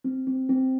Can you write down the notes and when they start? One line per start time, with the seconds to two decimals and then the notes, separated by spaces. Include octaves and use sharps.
0.04 C4
0.27 C4
0.49 C4